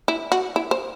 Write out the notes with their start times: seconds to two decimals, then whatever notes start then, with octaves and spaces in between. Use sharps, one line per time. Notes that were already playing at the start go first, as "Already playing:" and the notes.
0.08 E4
0.32 F#4
0.56 E4
0.71 C5